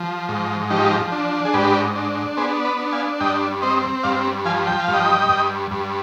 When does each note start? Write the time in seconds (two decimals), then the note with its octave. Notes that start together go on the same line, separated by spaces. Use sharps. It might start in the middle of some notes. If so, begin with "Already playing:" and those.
Already playing: F3
0.29 G#2
0.71 F3 D#4 G4
1.12 D4
1.45 G#4
1.54 G#2 G4 B4
1.96 D4
2.37 B3 G#4 C5
2.65 B4 D5
2.79 D4
2.92 F5 G#5
3.20 G2 D#5 G5
3.62 C4 C5 D#5
4.03 G2 D5 F5
4.45 F3 F5 G#5
4.67 G5
4.80 F5
4.88 G2
4.93 D#5 G5
5.29 G2
5.71 G2